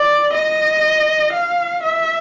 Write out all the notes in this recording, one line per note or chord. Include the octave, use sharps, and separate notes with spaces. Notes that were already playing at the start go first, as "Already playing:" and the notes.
Already playing: D5
D#5
F5
E5